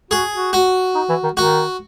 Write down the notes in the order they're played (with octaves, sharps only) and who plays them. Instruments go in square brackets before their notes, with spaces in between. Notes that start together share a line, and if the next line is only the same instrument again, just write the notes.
[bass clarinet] F#4 [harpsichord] G#4
[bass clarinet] F#4
[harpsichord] F#4
[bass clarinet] D#4
E3
D#3
[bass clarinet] D#3 [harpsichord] F#4